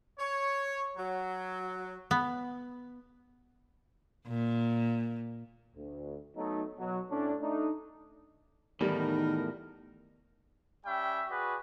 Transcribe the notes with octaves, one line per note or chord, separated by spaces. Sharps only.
C#5
F#3
B3
A#2
D2
F#3 A3 B3 D#4
B2 F#3
A2 A3 C#4 D4
A3 D4 D#4
E2 A2 D#3 G3 D#4 A#4
G3 C#4 E5 G5
F#4 G#4 B4 D5